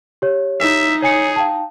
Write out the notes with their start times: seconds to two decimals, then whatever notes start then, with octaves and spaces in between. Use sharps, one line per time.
0.22 G4 C#5
0.60 D#4 E5
1.02 G#4 C#5 G#5 C#7
1.36 F5 G5 A5